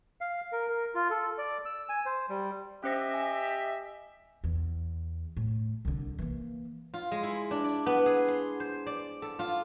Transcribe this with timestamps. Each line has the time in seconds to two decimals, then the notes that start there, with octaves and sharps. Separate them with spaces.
0.21 F5
0.52 A#4
0.68 A#4
0.95 F4
1.11 A4
1.38 D5
1.65 E6
1.89 G#5
2.06 C5
2.29 G3
2.84 C#4 G4 C5 D#5 E5 A#6
3.14 G#5
4.44 E2
5.37 A2
5.85 C2 D3
6.19 E3 A#3
6.94 F4
7.12 G#3
7.23 E4
7.51 D4
7.64 D5
7.86 B3
8.06 G#4
8.28 C6
8.60 C5
8.86 D5
9.22 A4
9.39 F4